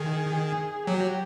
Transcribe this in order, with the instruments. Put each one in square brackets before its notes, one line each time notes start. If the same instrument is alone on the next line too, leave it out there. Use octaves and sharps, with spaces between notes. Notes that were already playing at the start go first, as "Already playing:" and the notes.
Already playing: [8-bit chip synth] D#3 [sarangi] G#4
[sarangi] G#4
[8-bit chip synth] F#3 [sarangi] G4